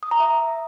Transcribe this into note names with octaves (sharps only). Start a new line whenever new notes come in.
D#6
A#5
E5